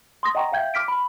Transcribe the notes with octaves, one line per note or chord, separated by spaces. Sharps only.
C6 D#6 A#6
D#5 F#5 G5 A#5 C#6
E5 F5 G5 G6 G#6
D6 F6 B6 D7
B5